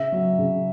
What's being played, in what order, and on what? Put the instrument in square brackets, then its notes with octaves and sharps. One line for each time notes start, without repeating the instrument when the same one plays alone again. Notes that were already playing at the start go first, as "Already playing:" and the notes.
Already playing: [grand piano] C#3 E5
F#3
C#3